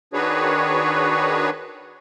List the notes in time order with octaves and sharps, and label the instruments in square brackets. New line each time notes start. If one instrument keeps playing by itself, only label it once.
[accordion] D#3 D4 F#4 G#4 B4 C#5